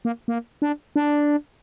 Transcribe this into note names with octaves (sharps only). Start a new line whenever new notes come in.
A#3
A#3
D4
D4